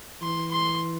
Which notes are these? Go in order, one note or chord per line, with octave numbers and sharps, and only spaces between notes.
E3 C6
C6